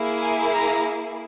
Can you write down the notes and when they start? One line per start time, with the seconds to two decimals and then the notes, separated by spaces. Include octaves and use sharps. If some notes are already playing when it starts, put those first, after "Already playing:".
Already playing: A#3 E4 G#4
0.21 G#5
0.54 A#5